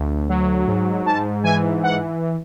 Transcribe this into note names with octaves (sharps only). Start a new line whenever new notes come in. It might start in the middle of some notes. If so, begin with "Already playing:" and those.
Already playing: D2
F#3
G#2
G#2 A5
E3 G#5
F#5